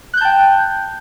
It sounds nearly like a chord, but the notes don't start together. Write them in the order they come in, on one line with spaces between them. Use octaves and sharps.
F#6 G6 A5 G5